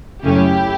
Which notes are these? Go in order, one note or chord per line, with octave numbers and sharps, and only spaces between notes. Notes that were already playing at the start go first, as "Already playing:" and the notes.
F#2 C#3 F#3 A3 C#4 E4 G4